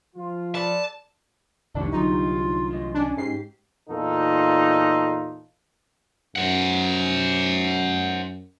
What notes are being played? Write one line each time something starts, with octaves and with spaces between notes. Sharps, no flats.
F3 F4
A4 B4 D5 A5
F1 C2 D#3 D4 E4 G4 C#5
C2 D3 F#3 D#4 F4
D2 E3 D#5
C#4 D4
G#2 G4 C7
E2 A#2 D#4 F4 A4
F#2 C5 F#5